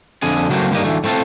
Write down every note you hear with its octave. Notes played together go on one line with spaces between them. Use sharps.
F2 D3 G#4
C#3 F#3 G3 A3 A#3 C4
G2 D3 D#3 A#3 G4 D#5
D2 E3 A3
A2 A3 C4 F4 A4